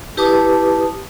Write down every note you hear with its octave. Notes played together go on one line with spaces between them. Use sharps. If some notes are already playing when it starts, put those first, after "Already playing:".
E4 G4 B4 A5 D6 D#6